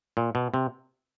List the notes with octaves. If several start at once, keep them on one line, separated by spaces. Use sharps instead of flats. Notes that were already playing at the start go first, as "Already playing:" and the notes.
A#2
B2
C3